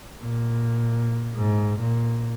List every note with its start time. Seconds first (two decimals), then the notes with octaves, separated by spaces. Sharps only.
0.20 A#2
1.35 G#2
1.80 A#2